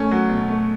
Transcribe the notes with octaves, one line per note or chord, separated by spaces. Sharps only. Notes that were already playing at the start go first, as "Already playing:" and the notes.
Already playing: A3 C#4
F#3
B2
A3